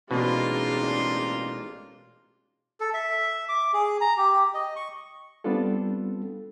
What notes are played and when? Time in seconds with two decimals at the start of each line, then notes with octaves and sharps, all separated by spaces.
0.11 A1 B2 G#3 A#3 C4 D4 D#4 F4
2.80 A4
2.94 E5
3.49 D6
3.73 G#4
4.01 A#5
4.18 G4
4.54 D#5
4.76 C#6
5.44 G3 B3 C4 D4 F4 A4